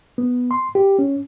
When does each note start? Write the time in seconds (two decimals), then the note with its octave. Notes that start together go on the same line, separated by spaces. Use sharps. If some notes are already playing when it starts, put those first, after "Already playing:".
0.18 B3
0.51 C6
0.75 G4
0.99 C#4